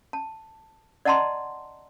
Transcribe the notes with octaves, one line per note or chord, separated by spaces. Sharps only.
A5
D5 D#5 F#5 A5 A#5 C6